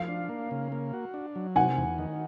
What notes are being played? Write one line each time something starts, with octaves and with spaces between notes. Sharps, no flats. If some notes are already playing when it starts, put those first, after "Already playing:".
Already playing: F3 F5
D4
A#3
C#3
A#3
F#4
D4
F#3
C3 F#5 G#5
E2
D#3